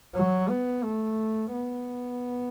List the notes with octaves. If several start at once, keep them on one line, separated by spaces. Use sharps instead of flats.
F#3
B3
A3
B3